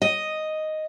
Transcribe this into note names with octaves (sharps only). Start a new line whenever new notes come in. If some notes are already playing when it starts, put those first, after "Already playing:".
D#5